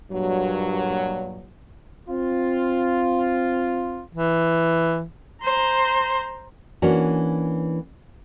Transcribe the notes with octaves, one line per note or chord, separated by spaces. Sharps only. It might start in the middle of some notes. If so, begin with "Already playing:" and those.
G2 A#2 F#3
C4 F4
E3
C5 A#5
E3 A#3 C#4 D4 F#4